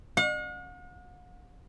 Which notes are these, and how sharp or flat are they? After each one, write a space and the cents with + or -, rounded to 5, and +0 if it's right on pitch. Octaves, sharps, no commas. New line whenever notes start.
F#5 -45